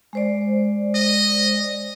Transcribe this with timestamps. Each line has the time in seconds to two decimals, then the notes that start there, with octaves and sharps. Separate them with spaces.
0.13 G#3 C5 D5
0.95 D#5